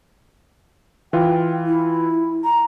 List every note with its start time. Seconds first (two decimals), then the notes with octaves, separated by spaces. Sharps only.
1.13 E3 F4 G5
1.66 E4
2.44 A#5